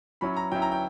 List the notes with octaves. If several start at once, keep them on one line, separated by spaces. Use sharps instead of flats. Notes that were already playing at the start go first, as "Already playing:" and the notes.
F#3 C#4 E4 B5
A#5
F#3 C#4 E4 G5
A#5
G5